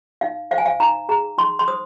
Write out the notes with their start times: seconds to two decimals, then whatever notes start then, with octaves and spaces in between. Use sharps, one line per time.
0.21 D#4 F5
0.51 C5 F5
0.58 G#5
0.66 F5
0.80 D#4 A#5
1.09 G#4 A#5
1.38 D#4 C6
1.59 C6
1.68 C5 D#6